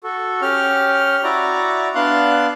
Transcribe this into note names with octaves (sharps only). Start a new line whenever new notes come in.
F#4 A4
C#4 G4 F6
E4 F#4 D5 A#5
B3 D4 F5 C6 F#6